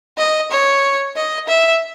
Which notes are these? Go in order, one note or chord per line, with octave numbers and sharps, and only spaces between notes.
D#5
C#5
D#5
E5